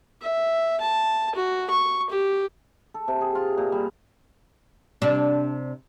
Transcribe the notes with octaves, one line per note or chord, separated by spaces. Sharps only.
E5
A5
F#4
C#6
G4
A4
C3
G#4
F4
A#2
G3
C3 D4